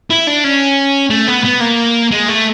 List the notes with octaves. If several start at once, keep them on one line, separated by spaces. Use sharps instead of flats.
E4
D4
C#4
A3
B3
B3
A#3
G#3
A3